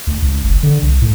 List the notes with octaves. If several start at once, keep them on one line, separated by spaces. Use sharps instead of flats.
D2
C#2
F#1
D3
C2
A2